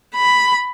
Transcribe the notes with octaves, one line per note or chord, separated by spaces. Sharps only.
B5